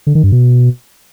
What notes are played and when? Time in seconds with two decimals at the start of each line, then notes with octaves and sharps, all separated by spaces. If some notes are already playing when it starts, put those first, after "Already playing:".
0.07 D3
0.15 D#3
0.24 G2
0.32 B2